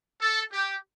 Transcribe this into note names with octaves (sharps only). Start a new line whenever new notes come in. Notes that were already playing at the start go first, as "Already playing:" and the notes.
A4
G4